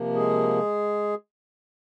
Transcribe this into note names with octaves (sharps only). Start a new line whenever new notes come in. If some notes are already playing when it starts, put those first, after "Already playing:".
Already playing: C3 F3 A#3
G#3 G#4